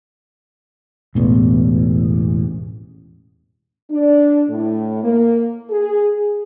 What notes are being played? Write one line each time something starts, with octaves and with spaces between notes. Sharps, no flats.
E1 A1 E2
D4
A2
A#3
G#4